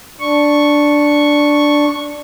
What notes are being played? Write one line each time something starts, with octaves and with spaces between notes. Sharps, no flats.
D4 C#6